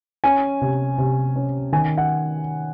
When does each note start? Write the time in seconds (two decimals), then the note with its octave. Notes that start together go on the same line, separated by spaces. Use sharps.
0.24 C#4 G#5
0.61 C3
0.98 C3
1.36 C#4
1.72 D#3 G#5
1.98 F#5